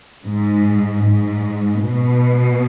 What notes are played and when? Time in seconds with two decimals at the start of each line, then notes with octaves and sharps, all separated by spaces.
0.25 G#2
1.04 G#2
1.82 B2